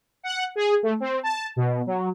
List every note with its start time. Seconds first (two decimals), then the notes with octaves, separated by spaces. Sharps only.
0.23 F#5
0.56 G#4
0.83 A3
1.00 C4
1.23 A5
1.56 B2
1.87 F#3